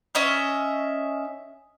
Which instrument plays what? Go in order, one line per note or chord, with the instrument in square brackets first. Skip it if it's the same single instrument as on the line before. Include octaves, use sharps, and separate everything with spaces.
[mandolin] C#4 D#5 E5